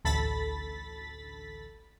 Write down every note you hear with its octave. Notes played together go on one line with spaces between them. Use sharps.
A1 D2 A4 B5 A6 B6